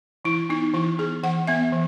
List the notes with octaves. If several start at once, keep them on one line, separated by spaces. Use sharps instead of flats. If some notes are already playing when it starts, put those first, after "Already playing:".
E3 E4
B3 D#4
E3 E4
B3 G#4
E3 F#5
B3 E5
E3